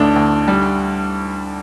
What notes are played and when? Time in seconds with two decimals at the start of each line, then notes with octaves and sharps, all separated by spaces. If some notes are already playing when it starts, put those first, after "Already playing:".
Already playing: A1 D2 D4
0.16 D2
0.48 G3